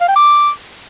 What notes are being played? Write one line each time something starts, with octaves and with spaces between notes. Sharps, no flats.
F5
G5
D6